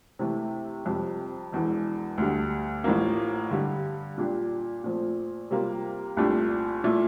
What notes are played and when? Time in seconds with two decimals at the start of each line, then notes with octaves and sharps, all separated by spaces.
0.19 C3 E3 A3 E4
0.86 F2 C3 G3
1.52 E1 E2 E3
2.18 D2 D3 G3 D4
2.84 A1 A2 F3 A#3
3.51 G2 D3 G3
4.18 A#2 G3 D4 G4
4.84 A#2 F3 A3 C4
5.51 C3 G3 A#3 F4
6.17 C2 A#2 A3 D4 G4
6.84 A#2 A3 E4